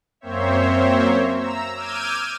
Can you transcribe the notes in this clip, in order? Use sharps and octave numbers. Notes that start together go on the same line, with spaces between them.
F#2 A#3 C4 C5 C#5 E5
A#5 E6
D6 E6 F6 G6 G#6 D#7